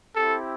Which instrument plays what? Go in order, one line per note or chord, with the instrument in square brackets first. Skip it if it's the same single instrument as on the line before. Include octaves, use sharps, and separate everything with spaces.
[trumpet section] C4 E4 G4 A4